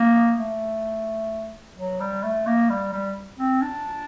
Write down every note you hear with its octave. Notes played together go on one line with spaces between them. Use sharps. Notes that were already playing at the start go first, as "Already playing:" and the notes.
Already playing: A#3
A3
F#3
G3
A3
A#3
G3
G3
C4
D4